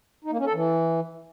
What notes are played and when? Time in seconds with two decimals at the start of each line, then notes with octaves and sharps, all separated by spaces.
0.25 D#4
0.32 A#3
0.39 C#4
0.46 A4
0.53 E3